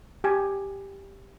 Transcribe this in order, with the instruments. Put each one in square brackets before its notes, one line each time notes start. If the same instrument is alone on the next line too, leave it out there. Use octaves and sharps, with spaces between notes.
[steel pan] G4 G#5